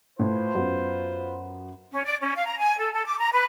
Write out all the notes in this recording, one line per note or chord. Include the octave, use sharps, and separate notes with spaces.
A2 F4 B4 C5
F#2 B3 F#4
C#4
D5
C#4
F5
A#5
G#5
A4
A4
D6
A#5
B4